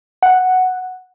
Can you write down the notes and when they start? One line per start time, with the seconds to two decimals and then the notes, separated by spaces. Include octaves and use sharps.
0.23 F#5